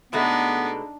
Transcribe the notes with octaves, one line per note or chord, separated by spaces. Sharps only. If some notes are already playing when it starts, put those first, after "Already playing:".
B2 G#3 A3 B3 D4 D#4